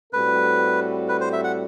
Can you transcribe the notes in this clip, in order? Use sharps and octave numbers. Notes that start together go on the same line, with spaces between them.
A2 G3 C4 F#4 A4 B4
B4
C5
E5
F#5